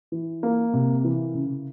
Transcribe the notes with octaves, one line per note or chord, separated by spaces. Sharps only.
E3
A#3
C3
E3
C#3